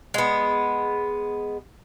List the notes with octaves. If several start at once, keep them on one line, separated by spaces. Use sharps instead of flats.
G#3 B3